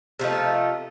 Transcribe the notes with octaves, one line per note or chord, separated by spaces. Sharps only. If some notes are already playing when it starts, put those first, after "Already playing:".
C3 F3 A3 D#4